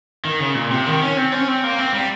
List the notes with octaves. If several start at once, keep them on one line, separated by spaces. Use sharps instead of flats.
D#3
C#3
A#2
C3
D#3
C#4
C4
C#4
C4
A#3
C4
G3